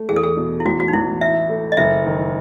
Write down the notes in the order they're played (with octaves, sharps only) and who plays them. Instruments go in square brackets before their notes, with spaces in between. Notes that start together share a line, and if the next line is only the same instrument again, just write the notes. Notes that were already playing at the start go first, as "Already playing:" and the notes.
Already playing: [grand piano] A3
[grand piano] E2 [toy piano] G#4
[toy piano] A4
G#4
[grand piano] B2
[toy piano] E4
[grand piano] A1 [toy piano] F#4
[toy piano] F#4
D#4
[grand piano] A1 [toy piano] E4
[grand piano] E4 [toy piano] E5
[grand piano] A3
[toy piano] D#5
[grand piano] F#1 [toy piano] E5
[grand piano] D#3